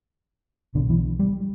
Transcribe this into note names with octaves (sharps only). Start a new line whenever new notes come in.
B1 B2 D3
E3
G3